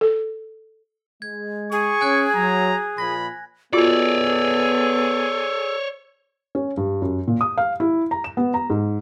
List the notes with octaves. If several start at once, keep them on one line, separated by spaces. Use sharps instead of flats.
A4
G#3 G#6
G#4 C#6
C#4 G#5 F#6 G#6
F#3 A#5
A#2 F3 B5 A#6
B3 F4 F#4 G#4 A4 C#5 D5 E6
C#4
G2
F#2
A#2
D#6
F5
E4
A#5
E7
B3
A#5
G#2